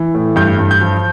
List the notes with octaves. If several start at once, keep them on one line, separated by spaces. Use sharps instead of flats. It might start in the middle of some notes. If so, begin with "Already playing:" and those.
Already playing: E3
A2
G2 G6
G2
G6
F3